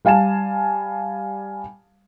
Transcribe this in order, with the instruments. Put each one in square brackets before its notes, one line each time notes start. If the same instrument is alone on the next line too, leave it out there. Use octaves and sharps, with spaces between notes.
[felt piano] G3 F5 G#5 A5 E7